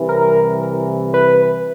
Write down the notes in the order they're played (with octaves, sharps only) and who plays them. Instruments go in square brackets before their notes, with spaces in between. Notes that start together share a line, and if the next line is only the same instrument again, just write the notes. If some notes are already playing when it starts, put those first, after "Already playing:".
Already playing: [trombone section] C2 C3 E3
[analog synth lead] A#4
B4